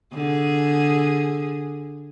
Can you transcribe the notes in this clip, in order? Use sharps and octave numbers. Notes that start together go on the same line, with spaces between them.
D3 G#4